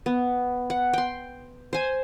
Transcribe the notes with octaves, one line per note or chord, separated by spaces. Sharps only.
B3
F#5
G5 C6
C5 G#5